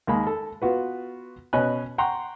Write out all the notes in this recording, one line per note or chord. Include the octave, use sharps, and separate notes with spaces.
D#2 G#3 A#3 B5
A4
B3 F4 F#4 B4
B2 C#4 D#5 G#5 B5 F#6
F#5 G5 A#5 C6 C#6